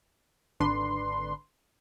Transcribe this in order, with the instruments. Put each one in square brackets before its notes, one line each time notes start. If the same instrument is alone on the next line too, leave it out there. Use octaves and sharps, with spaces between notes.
[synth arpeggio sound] G#1 D3 D4 B4 C6